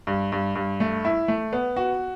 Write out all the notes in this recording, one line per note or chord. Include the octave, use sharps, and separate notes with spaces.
G2
G2
G2
A3
E4
A3
B3
F#4